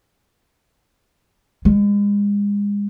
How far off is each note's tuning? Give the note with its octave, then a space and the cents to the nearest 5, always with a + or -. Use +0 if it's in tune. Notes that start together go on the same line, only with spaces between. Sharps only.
G#3 -35